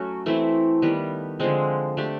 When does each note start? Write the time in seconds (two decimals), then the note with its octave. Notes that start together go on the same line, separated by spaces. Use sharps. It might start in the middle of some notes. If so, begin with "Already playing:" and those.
Already playing: F#3 A3 C#4 F#4
0.26 E3 A3 C4 E4
0.82 D#3 G3 B3
1.40 D3 F3 G#3 C4
1.97 A3 D4 G4